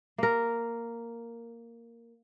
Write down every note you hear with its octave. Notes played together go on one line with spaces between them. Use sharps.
A#3 A#4